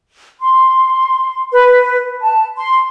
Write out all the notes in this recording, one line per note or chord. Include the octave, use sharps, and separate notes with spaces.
C6
B4
A5
C6